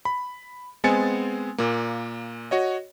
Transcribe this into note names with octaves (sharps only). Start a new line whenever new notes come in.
B5
G#3 B3 C4 G#5 A6 C#7
A#2 A#3
F#4 C#5 D#5